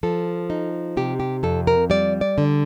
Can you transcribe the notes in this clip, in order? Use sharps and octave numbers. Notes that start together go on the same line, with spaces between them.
F3 A4
D#4
C3 G4
G4
F2 A4
A#4
G3 D5
D5
D3